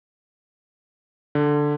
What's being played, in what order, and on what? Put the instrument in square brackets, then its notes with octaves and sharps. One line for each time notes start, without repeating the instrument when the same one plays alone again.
[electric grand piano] D3